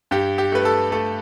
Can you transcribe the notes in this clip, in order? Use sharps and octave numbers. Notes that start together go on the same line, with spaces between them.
G2 G4
G4
A3 B4
A4
A3 A4